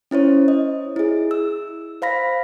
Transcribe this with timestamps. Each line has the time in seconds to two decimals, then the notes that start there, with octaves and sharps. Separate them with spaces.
0.11 C#4 E4 C5 C#5
0.48 D#5
0.96 E4 G#4
1.31 E6
2.02 C5 F5 B5 A#6 B6